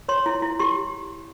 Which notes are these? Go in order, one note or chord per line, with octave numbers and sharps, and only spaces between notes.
C#5 C6
E4
E4
G4 C6